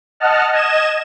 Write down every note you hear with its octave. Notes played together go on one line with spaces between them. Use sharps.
D#5 F#5 A5 F6
D#5 G#6 E7